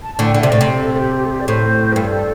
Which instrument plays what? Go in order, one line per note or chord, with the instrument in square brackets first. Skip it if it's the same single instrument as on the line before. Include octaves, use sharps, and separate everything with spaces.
[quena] A5
[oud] A2 D3 [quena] A5
[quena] G5
[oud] D3
[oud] C3 [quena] E5
[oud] A2 [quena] D5
[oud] C3
[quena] A4
A4
G4
G4
A4
G4
D5
[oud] A2 [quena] C5
[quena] G4
[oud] G2 [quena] A4